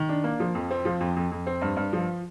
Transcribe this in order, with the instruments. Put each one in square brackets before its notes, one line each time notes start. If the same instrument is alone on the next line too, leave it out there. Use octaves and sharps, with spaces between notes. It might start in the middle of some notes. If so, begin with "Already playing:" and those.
Already playing: [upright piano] D#3
D4
A#3
F3
F2
C4
F3
F2
F2
F2
C4
G2
G2
F3